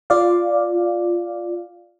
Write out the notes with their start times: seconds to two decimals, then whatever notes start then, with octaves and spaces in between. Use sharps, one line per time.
0.10 F4 D5 F5